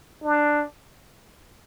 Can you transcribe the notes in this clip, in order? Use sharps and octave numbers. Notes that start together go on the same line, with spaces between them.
D4